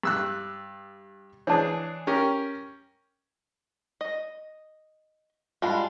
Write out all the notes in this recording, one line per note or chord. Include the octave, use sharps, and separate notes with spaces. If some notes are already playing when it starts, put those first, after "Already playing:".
G2 E6 F#6
E3 D4 G#4 C#5 A5
C#4 G4 A#4
D#5
G3 G#3 D4 F4 F5 B5